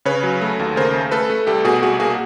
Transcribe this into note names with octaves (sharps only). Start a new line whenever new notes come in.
C#3 B4 C#5
F#3
A3
D#2
C#3 A#4 C5
A3
A3 A4 B4
A3
C2 G4 A4
B2 F#4 G#4
C2 F#4 G#4
A#3 F#4 G#4